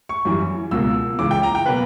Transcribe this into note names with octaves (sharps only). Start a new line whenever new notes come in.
C#6
F#2 E3 G3
C#2 B2 A#3 E6
C#2 C#3 E3 D6
G5
A#5
G5
B2 F#3 A#3 B4